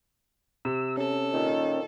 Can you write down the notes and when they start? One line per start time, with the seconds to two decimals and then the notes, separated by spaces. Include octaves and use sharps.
0.65 C3 E6
0.97 C#4 A4
1.32 A#2 D#3